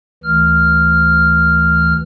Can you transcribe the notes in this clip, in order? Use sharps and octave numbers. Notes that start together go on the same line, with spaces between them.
D2 E3 F6